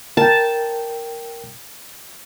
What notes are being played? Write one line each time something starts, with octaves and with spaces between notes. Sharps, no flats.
A#4 G5 A5